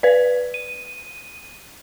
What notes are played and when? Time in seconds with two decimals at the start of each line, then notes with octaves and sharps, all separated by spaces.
0.03 B4 D5
0.54 D#7